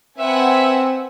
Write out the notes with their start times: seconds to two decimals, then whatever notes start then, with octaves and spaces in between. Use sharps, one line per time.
0.18 C4 B4 E5 F#5 G#5